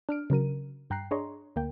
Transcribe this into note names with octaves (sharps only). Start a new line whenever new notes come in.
D4 F6 D7
C#3 F#3 A#4 D#7
G2 G5 A#5 F#6 C7
D4 G#4 C#5 D#5 A#5 C6
D2 A#3 G5